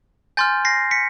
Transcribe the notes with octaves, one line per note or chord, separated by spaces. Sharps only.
G#5 C6 F6 G6 A6
A#6 C7
B6 C#7